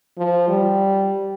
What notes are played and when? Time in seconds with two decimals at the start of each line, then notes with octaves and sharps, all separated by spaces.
0.18 F3
0.48 G3